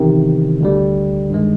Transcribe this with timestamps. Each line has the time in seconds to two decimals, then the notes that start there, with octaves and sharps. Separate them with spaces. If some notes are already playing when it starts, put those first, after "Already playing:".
Already playing: E2 C3 D#3
0.60 D2 D3 G3
1.30 G2 D#3 G#3